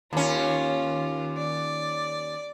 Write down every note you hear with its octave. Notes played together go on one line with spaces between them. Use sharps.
D#2 C#4 F4
D5